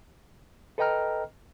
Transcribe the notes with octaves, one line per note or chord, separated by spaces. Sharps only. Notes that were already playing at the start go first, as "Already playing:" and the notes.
A4 B4 D#5 G5 A#5 F6